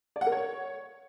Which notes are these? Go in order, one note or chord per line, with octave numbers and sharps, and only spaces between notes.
D5
F#5
A#4
C#5